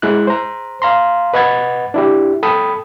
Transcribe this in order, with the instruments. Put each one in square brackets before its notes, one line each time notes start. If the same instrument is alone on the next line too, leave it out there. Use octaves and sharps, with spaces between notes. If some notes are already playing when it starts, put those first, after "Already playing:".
[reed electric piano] G#3 E4 F#6
C5 A#5
F5 A#5 C6
B4 D#5 F#5 B5 G#6 A6
D4 E4 G4
A4 G5 B5 D#6